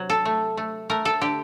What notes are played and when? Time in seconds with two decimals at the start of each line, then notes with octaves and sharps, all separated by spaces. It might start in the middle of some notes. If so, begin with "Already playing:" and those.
Already playing: C3 F#3
0.10 A4
0.25 A3
0.57 A3
0.90 A3 A#4
1.05 A4
1.21 D3 G4